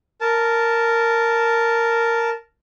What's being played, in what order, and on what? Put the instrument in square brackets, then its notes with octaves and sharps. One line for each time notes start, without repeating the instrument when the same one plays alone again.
[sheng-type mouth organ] A#4 A5